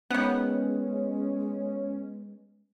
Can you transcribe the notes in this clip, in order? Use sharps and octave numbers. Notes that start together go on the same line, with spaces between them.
D#3 G#3 B3 C#4 F#5